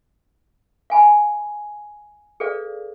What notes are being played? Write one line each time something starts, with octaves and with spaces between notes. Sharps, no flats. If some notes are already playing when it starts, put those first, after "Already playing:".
F5 G#5 B5
G#4 A4 B4 D5 F5